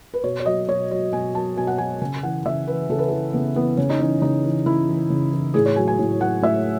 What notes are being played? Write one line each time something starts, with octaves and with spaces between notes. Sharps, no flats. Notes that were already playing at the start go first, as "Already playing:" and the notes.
B4
B2 C#5
C#5
F#3 D#5
B2 C#5
F#3 C#5
B2 G#5
F#3 A5
B2 G#5
F#5
F#3 G#5
C#3 G#5
E3 F#5
C#3 E5
E3 B4
C#3 A4
B4
E3 A4
C#3 B3
E3 B3
C#3 C#4
D#4
E3 C#4
C#3 D#4
E3
C#3 E4
E3
C#3
E3
A2 G#4
C#5
F#3 G#5
G#5
A2
F#3 F#5
A2 E5